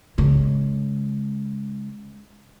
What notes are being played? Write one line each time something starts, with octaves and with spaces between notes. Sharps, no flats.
C#3 G#3